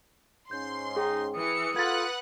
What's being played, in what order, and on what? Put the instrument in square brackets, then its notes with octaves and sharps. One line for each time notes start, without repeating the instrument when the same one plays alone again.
[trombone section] G#2 C#4 [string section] C6 [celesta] G6
[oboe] D#4 [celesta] G#4 G5
[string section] E3 C#7 [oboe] D#6
[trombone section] F4 A4 [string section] B4 F#5 F#6 [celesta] G#6 A6